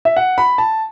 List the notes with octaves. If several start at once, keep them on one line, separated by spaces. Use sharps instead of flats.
E5
F#5
B5
A5